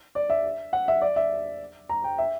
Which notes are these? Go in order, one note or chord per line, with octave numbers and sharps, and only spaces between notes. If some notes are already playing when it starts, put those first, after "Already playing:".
D5
E5
F#5
E5
D5
E5
A#5
G5
E5